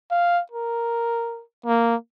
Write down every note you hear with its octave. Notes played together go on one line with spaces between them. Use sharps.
F5
A#4
A#3